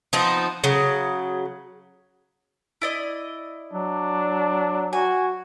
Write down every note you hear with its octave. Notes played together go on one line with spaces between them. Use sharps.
F3 B3 C4 D#4
C#3 F#3
E4 D5 D#5
F#3 D4
F#4 G#5